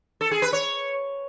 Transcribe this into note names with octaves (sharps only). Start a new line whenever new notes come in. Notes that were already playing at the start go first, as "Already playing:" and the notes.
A4
G#4
B4
C#5